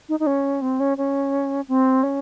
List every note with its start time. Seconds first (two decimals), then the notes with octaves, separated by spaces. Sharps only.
0.09 D#4
0.20 D#4
0.27 C#4
0.61 C4
0.80 C#4
0.98 C#4
1.68 C4
2.03 C#4